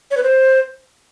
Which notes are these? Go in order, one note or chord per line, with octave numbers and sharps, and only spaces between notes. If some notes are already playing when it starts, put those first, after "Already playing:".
C#5
B4
C5